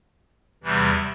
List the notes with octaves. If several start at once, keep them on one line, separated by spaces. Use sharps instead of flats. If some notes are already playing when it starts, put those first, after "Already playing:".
E2 C3 E3 G3